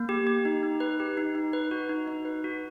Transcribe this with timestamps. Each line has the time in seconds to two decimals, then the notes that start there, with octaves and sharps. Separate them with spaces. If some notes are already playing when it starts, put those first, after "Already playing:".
Already playing: A#3
0.09 G4
0.27 G4
0.45 D#4
0.63 D#4
0.80 B4
1.00 G4
1.17 D#4
1.35 D#4
1.53 B4
1.71 F#4
1.89 D#4
2.08 D#4
2.25 B4
2.44 F#4